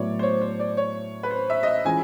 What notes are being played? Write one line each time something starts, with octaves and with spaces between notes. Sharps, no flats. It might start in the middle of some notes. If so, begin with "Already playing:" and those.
Already playing: A2 F#3 B3 E4 C#5 D5
C5
C#5
C5
D5
C#5
B4
C5
E5
D#5
E5
E3 G#3 C#4 F4 G#4 G#5